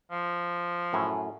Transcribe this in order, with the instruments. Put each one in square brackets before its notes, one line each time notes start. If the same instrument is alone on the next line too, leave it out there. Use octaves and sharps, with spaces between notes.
[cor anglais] F3
[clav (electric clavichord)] F#2 A2 G#5